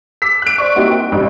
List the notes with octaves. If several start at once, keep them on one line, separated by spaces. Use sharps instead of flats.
D6 E6 B6
F#6 D7
C5 D5 C#6
G3 A#3 C4 D#4 E4 F#4
G5
A1 G2 C3